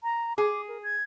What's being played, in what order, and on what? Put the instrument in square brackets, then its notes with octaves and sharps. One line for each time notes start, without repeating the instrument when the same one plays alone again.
[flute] A#5
[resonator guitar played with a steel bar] G#4 [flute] D6
[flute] A#4
G#6